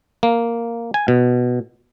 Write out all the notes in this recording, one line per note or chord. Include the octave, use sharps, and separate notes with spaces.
A#3
G#5
B2